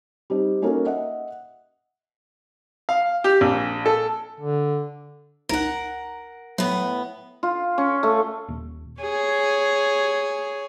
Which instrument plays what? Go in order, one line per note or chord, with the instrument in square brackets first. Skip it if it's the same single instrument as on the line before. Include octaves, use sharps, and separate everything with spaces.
[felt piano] G3 C4 D#4
A#3 C#4 D#4 F#4 A4 A#4
D#5 E5 F#5
[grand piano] F5
G4
A#1
A4
[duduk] D3
[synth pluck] G1 C#2 D#4 [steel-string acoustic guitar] A#4 F#5
[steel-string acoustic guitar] A2 B3 [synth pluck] F#3
[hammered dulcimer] F4
C#4
A3
[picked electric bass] D#1
[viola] G#4 C#5